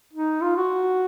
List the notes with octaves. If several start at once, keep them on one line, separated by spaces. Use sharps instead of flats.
D#4
F4
F#4